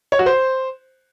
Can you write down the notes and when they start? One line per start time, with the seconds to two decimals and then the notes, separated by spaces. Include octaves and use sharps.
0.12 C#5
0.19 F#4
0.26 C5